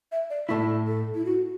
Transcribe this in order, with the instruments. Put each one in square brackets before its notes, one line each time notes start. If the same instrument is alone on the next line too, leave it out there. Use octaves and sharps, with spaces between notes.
[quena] E5
D5
[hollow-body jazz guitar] A2 A3 E4 [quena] A4
[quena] A4
E4
F#4